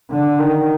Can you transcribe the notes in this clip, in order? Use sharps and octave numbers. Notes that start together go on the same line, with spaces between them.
D3
D#3